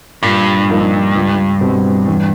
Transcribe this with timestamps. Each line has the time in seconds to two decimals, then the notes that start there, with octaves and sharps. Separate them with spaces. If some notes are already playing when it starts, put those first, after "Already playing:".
0.23 G2 A#2
0.69 F3 A#3 D#4
1.15 C#2
1.61 B2 G3 C4
2.08 E2